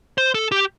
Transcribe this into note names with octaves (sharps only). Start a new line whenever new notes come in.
C5
A4
G4